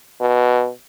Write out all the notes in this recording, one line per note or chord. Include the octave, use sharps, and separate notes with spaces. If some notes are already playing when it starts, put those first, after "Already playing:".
B2